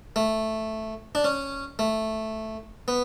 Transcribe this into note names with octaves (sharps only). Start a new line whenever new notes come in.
A3
D4
C#4
A3
B3